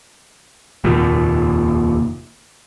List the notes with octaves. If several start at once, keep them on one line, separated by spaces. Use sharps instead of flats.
F1 D#2 A#2